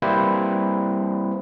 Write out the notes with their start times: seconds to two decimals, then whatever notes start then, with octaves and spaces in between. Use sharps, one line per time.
0.02 G3 A#3 C4 E4 B4 C5